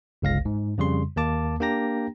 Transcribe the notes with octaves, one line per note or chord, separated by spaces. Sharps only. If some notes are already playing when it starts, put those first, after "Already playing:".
G1 C#2 F5 A#6
G#2
F2 C#3 G3 C6
D#2 A#3 A5 D6
A#3 D4 G4 G5 A#5 A#6